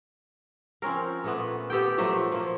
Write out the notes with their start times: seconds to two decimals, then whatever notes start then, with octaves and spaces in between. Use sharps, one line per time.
0.82 F3 C4 C#4 A#4
1.24 A#2 A3 B3
1.70 B3 G4 A4 G5
1.98 A#2 F3 F#3 A3
2.32 F3 A#3